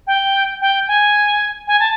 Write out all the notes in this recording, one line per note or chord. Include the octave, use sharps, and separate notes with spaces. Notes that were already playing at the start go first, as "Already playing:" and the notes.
G5
G5
G#5
G#5
A5